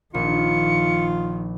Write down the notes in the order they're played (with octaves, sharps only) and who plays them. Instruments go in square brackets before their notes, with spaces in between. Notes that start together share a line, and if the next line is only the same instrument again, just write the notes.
[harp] A#1 [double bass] D#3 [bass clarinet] F4 [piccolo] C#7